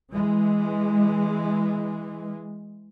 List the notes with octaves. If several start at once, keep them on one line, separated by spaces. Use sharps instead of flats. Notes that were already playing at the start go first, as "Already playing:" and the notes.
E3 G#3